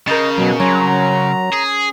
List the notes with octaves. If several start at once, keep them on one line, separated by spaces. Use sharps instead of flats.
C#3 A#4 D#5 G6 A6
B2 F#3
F#3 C#4 A#5 C6
G#4